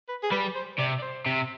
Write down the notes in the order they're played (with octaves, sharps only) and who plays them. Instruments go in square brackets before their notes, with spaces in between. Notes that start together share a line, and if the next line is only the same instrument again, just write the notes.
[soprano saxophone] B4
G#4
[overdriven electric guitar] G3 [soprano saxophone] B4
[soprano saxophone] C5
[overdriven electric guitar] C3 [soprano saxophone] D5
[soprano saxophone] D5
C5
[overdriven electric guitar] C3